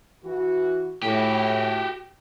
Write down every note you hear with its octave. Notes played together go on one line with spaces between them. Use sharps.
E3 F#4
A2 F#4 G4